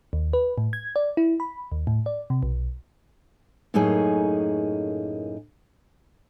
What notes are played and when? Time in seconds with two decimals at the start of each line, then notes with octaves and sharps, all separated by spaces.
0.13 D#2
0.33 B4
0.58 A2
0.73 G#6
0.96 D5
1.17 E4
1.40 B5
1.72 D#2
1.87 A2
2.06 D5
2.30 C3
2.43 B1
3.74 F#2 A2 A#3 D#4 G#4 C#5